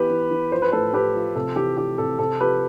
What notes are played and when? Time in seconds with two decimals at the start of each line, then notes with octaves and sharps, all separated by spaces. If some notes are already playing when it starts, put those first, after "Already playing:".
Already playing: E3 B3 G4 B4
0.10 E3
0.31 E3
0.52 F3 C5
0.62 B4
0.72 A2 A4 C5
0.93 A2 G4 B4
1.15 F3
1.35 C3 A4
1.56 E3 G4
1.77 E3 G4
1.98 C3 A4
2.19 C3 A4
2.40 F3 G4 B4